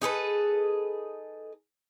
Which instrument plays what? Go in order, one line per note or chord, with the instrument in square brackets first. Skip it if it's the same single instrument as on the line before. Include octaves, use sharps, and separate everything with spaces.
[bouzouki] D#4 G#4 A4 B4